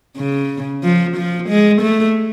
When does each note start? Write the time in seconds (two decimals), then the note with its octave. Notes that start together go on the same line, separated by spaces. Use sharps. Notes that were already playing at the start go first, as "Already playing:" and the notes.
0.17 C#3
0.83 F3
1.16 F3
1.48 G#3
1.81 A3